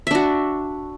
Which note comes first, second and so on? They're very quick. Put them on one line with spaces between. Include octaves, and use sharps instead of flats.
E5 D4 F#4